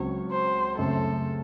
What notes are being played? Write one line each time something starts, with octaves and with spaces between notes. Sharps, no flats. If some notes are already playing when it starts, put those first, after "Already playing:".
Already playing: C#2 C#3 F#3 C4 C#5
C5
F#2 C#3 A3 C4 A4